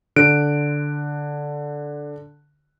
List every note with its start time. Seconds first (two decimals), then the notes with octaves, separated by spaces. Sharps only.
0.16 D3 F#6 D7